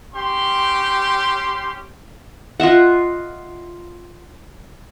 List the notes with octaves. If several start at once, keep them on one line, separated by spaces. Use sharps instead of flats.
C#4 G4 G5 C6
F4 D#5 E5 F#5